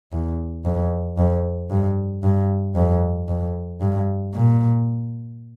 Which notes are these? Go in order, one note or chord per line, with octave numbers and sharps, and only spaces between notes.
E2
F2
F2
G2
G2
F2
F2
G2
A#2